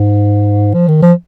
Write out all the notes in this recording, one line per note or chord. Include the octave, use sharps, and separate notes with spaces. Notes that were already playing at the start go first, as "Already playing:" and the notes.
Already playing: G#2
F3
D#3
F3